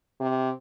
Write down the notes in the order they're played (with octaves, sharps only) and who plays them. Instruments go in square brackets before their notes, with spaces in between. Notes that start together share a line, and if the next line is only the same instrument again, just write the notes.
[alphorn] C3